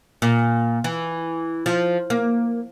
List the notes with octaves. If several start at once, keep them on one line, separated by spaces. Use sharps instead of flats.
A#2
E3
F3
A#3